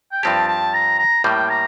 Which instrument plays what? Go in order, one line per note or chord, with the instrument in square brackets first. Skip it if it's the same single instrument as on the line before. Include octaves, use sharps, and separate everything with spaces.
[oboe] G5
[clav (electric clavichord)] G2 F3 C4 G4 [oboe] A5
[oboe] A5
A#5
A#5
[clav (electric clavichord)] A2 G3 A#3 [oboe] G5
[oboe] A#5